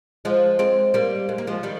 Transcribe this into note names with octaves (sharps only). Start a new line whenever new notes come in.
F3 G#3
G#3 C4
G3 A#3
G#3
A#3
F3 G#3
D#3 G3